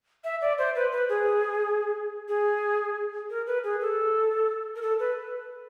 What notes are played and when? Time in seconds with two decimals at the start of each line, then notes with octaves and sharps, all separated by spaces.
0.24 E5
0.41 D5
0.58 C5
0.75 B4
0.92 B4
1.09 G#4
2.28 G#4
3.30 A#4
3.47 B4
3.64 G#4
3.81 A4
4.76 A#4
4.82 A4
4.99 B4